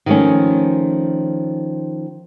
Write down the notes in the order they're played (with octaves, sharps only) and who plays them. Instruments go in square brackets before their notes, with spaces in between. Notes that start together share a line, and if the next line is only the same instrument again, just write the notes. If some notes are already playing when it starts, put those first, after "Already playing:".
[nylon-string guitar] D#3 F3 G3 A3 C#4